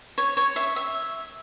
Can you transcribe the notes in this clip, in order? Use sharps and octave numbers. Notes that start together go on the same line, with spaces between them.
C#5
C#5
E5
E5